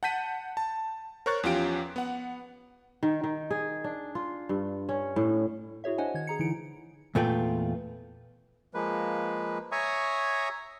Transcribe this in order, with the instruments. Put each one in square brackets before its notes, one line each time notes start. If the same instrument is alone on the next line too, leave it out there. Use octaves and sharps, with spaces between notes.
[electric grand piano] F#5 A5 G6 B6 D#7
A5
A#4 C5 C#5 C#6 F#6 A6
E2 F3 C#4 F4 G4 D7
B3 F#5
[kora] D#3
D#3
G#4
D4
F4
G2
C#4
A2
[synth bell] E4 F#4 G#4 C#5 E5
D4 C5 D#5 F#5 G#5
D#3 G#6
G#4 A#5 C#7
D3 E3 D#4 E4 C#7 D7
[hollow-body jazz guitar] E2 A#2 A3 F4 B4 G5
[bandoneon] F3 G#3 A#3 B4
C#5 E5 G#5 A#5 C#6 D#6